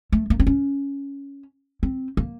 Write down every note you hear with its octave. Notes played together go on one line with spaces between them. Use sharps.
A3
A#3
C4
C#4
C4
A#3